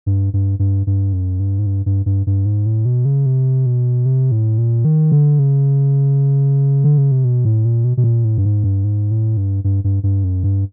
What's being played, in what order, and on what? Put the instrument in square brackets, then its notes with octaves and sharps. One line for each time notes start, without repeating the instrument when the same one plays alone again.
[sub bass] G2
G2
G2
G2
F#2
G2
G#2
G2
G2
G2
G2
G#2
A2
B2
C#3
C3
B2
C3
A2
A#2
D#3
D3
C#3
D3
C#3
C3
B2
A2
A#2
B2
B2
A#2
A2
G2
G#2
G2
G#2
A2
G2
G2
G2
G2
F#2
G2